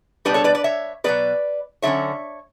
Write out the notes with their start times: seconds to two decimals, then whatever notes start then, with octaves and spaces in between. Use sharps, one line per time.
0.25 B2 G3 D4 G4 B4
0.34 A4 C#5
0.44 B4 D5
0.55 B4 D5
0.64 C#5 E5
1.04 B2 F#3 B3 B4 D5
1.82 D3 F#3 C#4 C#5 E5